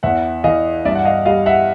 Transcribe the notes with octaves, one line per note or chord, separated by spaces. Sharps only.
E2 E5 F#5
E3 D#5 F5
G2 D5 E5
F#5
D#5 F5
G3 D#5 F5
E5 F#5